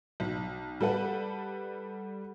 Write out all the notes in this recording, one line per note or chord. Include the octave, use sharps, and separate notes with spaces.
B1
G3 A4 B4 F#5